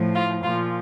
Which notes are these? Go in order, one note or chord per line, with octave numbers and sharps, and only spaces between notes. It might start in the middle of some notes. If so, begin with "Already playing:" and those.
Already playing: A2 F3
F4
A#2 F3 F4